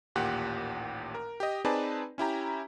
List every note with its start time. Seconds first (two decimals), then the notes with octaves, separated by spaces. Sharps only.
0.15 A1 D#2 A#2 G4 F#5 F#6
1.14 A#4
1.40 G4 D#5
1.65 C4 D#4 G#4 B4 D5 A5
2.18 C#4 E4 G4 A#5